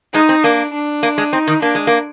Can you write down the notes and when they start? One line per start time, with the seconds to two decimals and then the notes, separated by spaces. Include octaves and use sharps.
0.14 G#3 D#4
0.29 C4
0.44 A#3 D4
0.73 D4
1.03 A#3
1.18 G#3
1.33 C4 D#4
1.47 D#3
1.62 A#3 D4
1.75 G#3
1.87 A#3